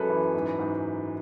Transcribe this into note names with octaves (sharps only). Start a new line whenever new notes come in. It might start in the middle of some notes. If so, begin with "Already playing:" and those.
Already playing: F#2 G#3 A4 B4
E3
G#2
G#2